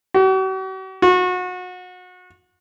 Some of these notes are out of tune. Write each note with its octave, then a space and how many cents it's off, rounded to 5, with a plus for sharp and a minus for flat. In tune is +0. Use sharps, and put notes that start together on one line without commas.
F#4 +45
F#4 -30